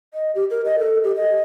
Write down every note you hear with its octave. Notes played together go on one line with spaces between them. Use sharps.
D#5
G4
A#4
D#5
A4
G4
D#5